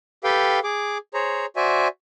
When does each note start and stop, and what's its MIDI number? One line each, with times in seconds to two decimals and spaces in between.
0.24 0.59 67
0.24 0.59 69
0.24 0.59 71
0.24 0.59 77
0.24 0.59 79
0.64 0.98 68
0.64 0.98 86
1.14 1.46 68
1.14 1.46 72
1.14 1.46 73
1.14 1.46 82
1.56 1.88 66
1.56 1.88 72
1.56 1.88 74
1.56 1.88 76
1.56 1.88 80